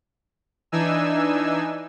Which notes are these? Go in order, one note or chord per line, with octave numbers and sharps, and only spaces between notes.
E3 D4 D#4 G#5 E6